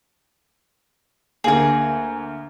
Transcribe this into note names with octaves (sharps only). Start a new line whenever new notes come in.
D2 A#3 G#4 A#4